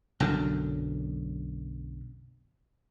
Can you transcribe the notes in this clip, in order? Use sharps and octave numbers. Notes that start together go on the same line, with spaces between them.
B1 F#2 D3